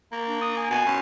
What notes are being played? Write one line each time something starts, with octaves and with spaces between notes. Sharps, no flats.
A#3
D4
D#6
G#5
B2 G#5
F#2